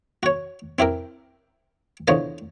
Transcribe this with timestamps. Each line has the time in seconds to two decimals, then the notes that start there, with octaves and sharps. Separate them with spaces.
0.23 F#4 C#5
0.79 C4 E4 G4 A#4
2.08 E2 D3 F3 C5 C#5 D#5